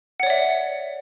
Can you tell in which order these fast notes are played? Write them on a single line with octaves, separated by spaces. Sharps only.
F#5 C#5 D5 E5